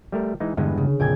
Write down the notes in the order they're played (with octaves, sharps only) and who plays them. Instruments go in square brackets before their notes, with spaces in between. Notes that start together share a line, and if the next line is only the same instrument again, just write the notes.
[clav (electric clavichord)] G3 A3 A#4
E3 G#3 D#4
[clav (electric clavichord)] E2 G2 G#3 [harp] D3 B3
[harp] C#3
[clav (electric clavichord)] A#1 F2 [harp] G5 G#5 G#6